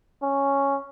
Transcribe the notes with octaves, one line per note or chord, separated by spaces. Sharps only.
C#4